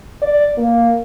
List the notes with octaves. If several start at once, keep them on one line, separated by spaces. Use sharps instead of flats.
D5
A#3